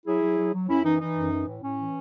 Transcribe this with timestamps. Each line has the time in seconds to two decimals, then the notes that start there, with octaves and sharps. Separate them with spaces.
0.06 F#3 E4 G#4
0.22 F#3
0.38 F#3
0.53 F#3
0.69 F#2 C#4 E4
0.84 E3 D#4
1.00 E3 D#4
1.16 F#2
1.32 E3
1.47 A2
1.63 A2 C#4
1.78 E3